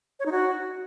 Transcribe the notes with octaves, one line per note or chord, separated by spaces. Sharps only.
C#5
D#4
F#4